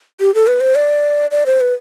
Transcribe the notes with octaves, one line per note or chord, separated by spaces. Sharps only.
G4
A4
B4
C5
D5
D5
C5
B4